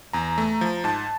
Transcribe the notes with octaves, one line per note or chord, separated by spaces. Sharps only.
E2 A#5
A3
F3
G#2 A5